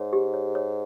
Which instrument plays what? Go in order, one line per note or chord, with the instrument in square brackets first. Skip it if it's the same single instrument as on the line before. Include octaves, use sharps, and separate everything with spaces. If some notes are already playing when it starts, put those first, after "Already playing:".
Already playing: [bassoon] G#2 [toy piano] C#5
[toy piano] G4
C#5
C#5